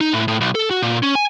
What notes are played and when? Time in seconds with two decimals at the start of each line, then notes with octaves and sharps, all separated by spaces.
0.01 D#4
0.13 A2
0.28 A2
0.41 B1
0.55 A4
0.71 F#4
0.82 A#2
1.03 C#4
1.15 G#5